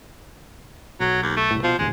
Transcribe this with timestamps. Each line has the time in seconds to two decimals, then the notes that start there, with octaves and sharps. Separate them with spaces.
1.00 B1 F#3
1.23 D#2
1.37 A3
1.51 C2 A2
1.63 B2 F3
1.79 D#1 A1 D2 G#3